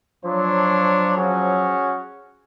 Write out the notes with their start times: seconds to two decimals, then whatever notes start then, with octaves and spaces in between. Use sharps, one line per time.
0.24 F3 F#3 D4 C#5 C6
1.17 C#4 F#4 G#4